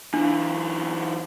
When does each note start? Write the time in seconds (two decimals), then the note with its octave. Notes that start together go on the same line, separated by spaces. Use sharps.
0.14 E3 F#3 D4